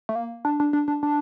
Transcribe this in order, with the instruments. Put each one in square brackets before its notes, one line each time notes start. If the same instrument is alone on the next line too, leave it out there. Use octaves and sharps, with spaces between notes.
[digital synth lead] A3
A#3
D4
D4
D4
D4
D4